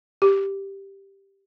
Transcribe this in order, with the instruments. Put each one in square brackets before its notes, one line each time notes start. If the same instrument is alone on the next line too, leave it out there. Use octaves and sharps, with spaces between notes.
[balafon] G4